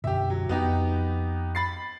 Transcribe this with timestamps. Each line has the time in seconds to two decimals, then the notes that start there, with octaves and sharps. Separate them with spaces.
0.04 F#2 B2 D3 G4 E5
0.30 F#3
0.49 F2 B3 D#4 G4
1.55 B5 A6 C7